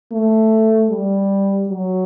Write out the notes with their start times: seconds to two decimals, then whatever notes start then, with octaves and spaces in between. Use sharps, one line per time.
0.12 A3
0.90 G3
1.68 F#3